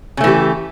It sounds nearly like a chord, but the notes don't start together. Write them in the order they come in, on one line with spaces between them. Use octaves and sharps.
C#3 A3 E3 G4